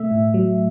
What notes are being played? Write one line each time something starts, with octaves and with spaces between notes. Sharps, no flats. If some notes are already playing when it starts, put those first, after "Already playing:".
Already playing: B2 A3 E5
A2
F#3